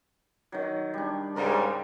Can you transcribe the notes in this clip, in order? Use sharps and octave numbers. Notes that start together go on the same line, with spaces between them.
D#3 F#3
G3 D4
G#2 C#3 G3 A#4